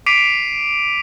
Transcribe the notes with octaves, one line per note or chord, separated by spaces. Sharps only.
D6 B6 C7 D7 D#7 F7